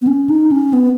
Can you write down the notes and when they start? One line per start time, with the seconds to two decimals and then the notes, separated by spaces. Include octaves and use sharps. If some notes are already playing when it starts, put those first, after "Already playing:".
0.02 B3
0.07 C#4
0.29 D#4
0.51 C#4
0.73 B3